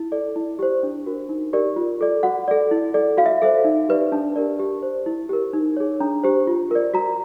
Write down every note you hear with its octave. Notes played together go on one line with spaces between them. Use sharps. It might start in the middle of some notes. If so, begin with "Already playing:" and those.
Already playing: E4
A4 D5
E4
G4 C5
D4
F#4 A#4
D#4
G4 A#4 D5
F4
A4 D5
F#4 F#5
A4 D5
E4
A4 D5
F#4 F5
E5
A4 C5 E5
D#4
G4 B4 D5
D4 A5
G4 A#4 D5
G4
C5
E4
G4 A#4
D#4
G#4 C#5
D4 A#5
G4 C5
F4
A#4 D5
F#4 A#5